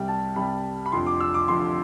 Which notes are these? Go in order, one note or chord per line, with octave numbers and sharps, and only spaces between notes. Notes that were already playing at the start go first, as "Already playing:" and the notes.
Already playing: C2 C3 G3 G5
A5
C2 C3 G3 B5
B5
F1 F2 D3 F3 C6
D6
E6
D6
F1 F2 D3 F3 C6